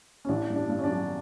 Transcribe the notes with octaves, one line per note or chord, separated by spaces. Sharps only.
C#4
A1 D4
G2
D4
G2
C#4
D4
F#3